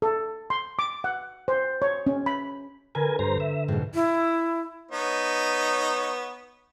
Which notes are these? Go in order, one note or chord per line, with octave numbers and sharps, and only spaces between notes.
A4
C6
D6
F#5
C5
C#5
C#4
B5
D3 A#4 B4 G#5
G2 C5 A#5
E5
F2 G#2 B2
E4
B3 D#4 C#5